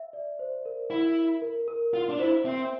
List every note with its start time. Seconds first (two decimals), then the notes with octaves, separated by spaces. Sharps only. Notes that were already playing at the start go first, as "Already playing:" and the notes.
Already playing: E5
0.13 D5
0.39 C5
0.65 A#4
0.90 E4
1.42 A#4
1.68 A#4
1.94 F4
2.09 D4
2.19 E4 C5
2.45 C4 E5